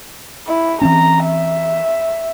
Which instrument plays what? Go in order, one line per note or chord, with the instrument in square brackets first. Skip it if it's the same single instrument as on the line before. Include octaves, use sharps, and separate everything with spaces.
[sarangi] E4
[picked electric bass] E3 C4 C#4 [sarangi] A#5
[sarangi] E5